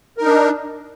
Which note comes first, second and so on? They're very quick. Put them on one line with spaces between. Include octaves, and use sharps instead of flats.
A#4 D#4 D4